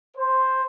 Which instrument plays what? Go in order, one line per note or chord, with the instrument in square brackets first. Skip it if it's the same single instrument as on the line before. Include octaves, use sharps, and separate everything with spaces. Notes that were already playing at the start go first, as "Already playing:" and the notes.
[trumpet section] C5